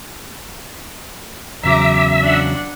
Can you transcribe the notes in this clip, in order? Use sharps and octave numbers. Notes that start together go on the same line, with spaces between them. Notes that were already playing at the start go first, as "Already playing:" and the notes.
E2 C#3 F#3 E5 A#5 D6
D4 F#5